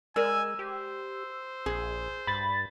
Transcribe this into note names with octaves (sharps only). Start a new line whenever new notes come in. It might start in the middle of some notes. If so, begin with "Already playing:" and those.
G#3 A#4 D5 G#5 E6
G4 C5
A#1 G#4
G2 B5 A6